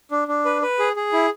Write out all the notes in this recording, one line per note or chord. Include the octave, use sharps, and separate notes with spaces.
D4
D4
B4
B4
G#4
G#4
E4